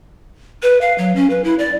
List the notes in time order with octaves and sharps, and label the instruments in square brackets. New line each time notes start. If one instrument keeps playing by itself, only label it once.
[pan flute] B4
F5
F#3
C#4
B4
E4
D5